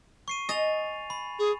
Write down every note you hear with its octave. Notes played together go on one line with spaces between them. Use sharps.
C#6 C7 D#7
D#5 G#5 A6 F7
B5
G#4